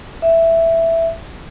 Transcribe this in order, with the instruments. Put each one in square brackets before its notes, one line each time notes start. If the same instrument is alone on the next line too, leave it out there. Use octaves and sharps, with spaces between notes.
[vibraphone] E5